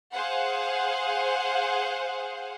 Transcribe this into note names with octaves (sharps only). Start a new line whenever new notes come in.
G#4 C5 F5 F#5